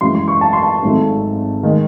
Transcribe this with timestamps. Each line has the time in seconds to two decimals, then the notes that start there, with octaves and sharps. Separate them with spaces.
0.01 F#2 E3 G#3 C6
0.15 C6
0.28 C#6
0.41 A5
0.53 C6
0.63 A5
0.82 G#1 G#2 F#3 A3
1.63 D#3 G#3